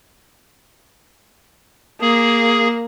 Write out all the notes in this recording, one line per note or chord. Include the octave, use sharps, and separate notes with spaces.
A#3 G#4